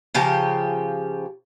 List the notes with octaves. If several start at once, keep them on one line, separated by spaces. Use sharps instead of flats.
C#3 F3 G4 A#5